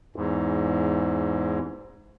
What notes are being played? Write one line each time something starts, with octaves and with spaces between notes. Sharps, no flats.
E2 G#2